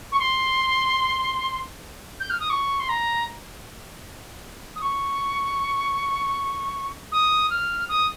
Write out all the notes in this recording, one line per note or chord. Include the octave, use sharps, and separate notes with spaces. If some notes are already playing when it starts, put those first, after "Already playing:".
C#6
C6
G6
F6
D#6
C#6
C6
A#5
D#6
C#6
D#6
F6
D#6